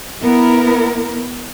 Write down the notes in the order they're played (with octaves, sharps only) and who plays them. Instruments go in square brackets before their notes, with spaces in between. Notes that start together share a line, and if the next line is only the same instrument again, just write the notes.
[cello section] B3 E4 A#4